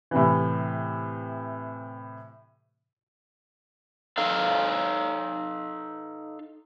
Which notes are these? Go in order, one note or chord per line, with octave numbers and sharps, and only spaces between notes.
A2 C3 E3
D#4 A4 F5